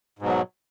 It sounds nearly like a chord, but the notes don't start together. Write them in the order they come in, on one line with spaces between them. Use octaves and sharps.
G#2 B2 F#3